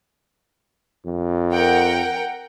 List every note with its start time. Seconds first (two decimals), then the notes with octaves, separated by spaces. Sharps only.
1.05 F2
1.52 A#4 F#5 G5